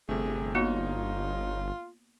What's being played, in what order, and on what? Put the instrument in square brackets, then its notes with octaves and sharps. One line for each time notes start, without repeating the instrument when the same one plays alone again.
[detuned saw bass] G1 [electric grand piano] C3 A3 [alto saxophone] G#4
[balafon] A#3 B3 F#4 [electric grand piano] D#4 C#5 [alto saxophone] F4